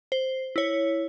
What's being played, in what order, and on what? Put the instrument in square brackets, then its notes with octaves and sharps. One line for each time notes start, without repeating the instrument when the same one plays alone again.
[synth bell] C5
E4 C#5